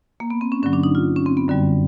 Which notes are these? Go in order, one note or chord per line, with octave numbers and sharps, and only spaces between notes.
A#3
B3
C4
C#4
G2 D3 F#3 C#4
D4
D#4
F4
C#4
C4
B3
F#2 D3 G3